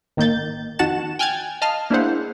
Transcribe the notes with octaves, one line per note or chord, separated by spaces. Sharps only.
A1 D#3 A#3 D#4 G6 A6
F2 D#3 F#4 F#5 A5 E7
G5 G#5 F6 F#6 G#6 A6
D#5 F5 A5 F6
A#3 D4 E4 G#4 C5 F#5